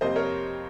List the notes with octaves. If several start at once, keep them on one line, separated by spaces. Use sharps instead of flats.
F2 C3 G3 A#3 C5 D#5
A#4 C#5